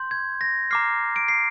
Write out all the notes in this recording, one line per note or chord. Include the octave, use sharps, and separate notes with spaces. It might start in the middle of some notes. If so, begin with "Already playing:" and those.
Already playing: C6 G6
G#6
A#6
A#5 D6 F6 C7
D7
C7